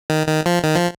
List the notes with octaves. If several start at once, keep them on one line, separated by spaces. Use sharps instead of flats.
D#3
D#3
F3
D#3
F3